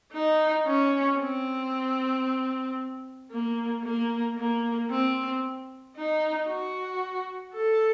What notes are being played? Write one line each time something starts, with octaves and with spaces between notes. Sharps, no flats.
D#4
C#4
C4
A#3
A#3
A#3
C4
D#4
F#4
A4